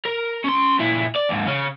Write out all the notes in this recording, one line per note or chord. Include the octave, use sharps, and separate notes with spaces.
A#4
C#4 C6
A#2 E4
D5
D#2 G#2
C#3 C#4